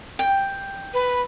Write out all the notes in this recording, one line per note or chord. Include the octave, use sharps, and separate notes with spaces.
G5
B4